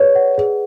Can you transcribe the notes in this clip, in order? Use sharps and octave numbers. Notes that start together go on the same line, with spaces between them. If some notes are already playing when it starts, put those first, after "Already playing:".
Already playing: G#4 B4 C#5 D5
F#5
G#4